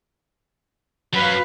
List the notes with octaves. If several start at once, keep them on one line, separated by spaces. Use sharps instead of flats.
F#2 F#3 B4 F5